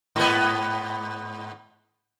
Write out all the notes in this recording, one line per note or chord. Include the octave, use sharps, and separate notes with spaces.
G#2 B3